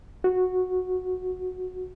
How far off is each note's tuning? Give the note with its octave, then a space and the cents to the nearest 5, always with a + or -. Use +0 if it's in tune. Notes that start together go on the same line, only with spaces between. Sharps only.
F#4 -10